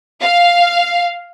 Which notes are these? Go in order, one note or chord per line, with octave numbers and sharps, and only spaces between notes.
F5